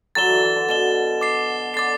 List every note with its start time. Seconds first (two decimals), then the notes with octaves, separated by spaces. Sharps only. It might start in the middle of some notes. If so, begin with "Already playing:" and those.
0.15 D3 F#3 A6 E7 G7
0.29 E3
0.43 E3
0.56 D3
0.69 B2 A6 E7 G7
1.21 D6 A6 C7
1.74 D3 D6 A6 C7